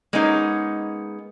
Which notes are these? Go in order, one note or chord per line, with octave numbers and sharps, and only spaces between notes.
G#3 A#3 B3 C#4 D#4 G#4